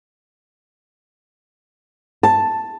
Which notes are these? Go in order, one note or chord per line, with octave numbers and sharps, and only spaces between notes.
A5